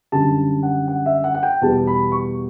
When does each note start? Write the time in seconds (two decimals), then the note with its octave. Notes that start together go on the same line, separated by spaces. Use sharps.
0.12 F#2 D3 G3 A5
0.63 F#5
0.88 F#5
1.06 E5
1.24 F#5
1.34 F#5
1.43 G5
1.61 E2 B2 G3 B3 A5
1.87 B5
2.12 C#6